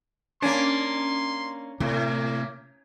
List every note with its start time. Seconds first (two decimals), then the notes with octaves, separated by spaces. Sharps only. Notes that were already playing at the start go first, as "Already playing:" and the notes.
0.42 A#3 C#4 D4 C6
1.80 A2 C3 A#3